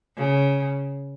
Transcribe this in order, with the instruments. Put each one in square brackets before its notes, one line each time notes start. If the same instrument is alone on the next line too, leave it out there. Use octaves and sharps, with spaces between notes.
[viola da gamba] C#3